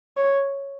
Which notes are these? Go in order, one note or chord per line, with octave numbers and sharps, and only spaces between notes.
C#5